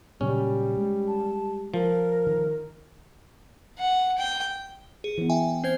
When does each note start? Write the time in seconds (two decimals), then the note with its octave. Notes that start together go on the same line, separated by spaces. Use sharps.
0.21 A#2 C#3 F#3 G3 C#4
0.77 G#3
1.07 A5
1.74 F3 A#4
2.27 D#3
3.79 F#5
4.18 G5
5.04 G#4
5.18 E3 B3
5.29 E5 G5 G#5
5.64 C4 C5 G#6